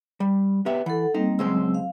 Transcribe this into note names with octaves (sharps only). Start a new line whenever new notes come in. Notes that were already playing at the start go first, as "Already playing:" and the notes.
G3
B3 G4 E5
E3 A4 F#5
G3 A#3 C4 D#4
C#2 F#3 G#3 C4 C5 E6
F5